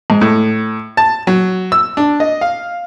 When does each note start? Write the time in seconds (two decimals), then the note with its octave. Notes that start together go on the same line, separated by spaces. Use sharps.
0.10 G#2
0.21 A2
0.97 A5
1.27 F#3
1.72 E6
1.97 D4
2.20 D#5
2.41 F5